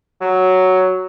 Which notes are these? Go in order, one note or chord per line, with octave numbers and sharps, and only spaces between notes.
F#3